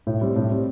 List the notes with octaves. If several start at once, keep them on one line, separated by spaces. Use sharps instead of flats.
A2
G3 C4
A2
G3 C4